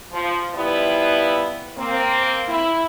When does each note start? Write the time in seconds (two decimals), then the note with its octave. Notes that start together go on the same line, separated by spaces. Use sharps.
0.12 F3
0.54 F3 G3 B3 E4
1.77 A#3 C4
2.48 E4